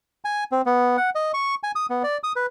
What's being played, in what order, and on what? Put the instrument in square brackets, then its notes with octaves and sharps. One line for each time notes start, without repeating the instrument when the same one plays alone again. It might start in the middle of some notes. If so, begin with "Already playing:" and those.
[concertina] G#5
C4
B3
F#5
D#5
C#6
G#5
D#6
B3
D5
D#6
B4